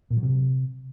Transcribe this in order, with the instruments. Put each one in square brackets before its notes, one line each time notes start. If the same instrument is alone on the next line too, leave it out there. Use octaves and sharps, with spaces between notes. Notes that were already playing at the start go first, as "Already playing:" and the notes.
[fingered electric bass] A#2
F#3
C3